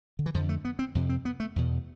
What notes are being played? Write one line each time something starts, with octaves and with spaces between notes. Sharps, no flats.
D3
E3
F2 D3 F3
A3
B3
C4
F2 C3
C4
B3
A3
E2 B2